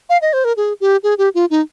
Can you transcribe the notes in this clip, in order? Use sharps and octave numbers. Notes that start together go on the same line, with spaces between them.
F5
D#5
C5
A#4
G#4
G4
G#4
G4
F4
D#4